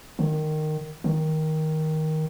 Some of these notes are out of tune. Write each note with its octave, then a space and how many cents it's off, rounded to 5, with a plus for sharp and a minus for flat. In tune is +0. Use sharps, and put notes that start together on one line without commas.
D#3 -15
D#3 +10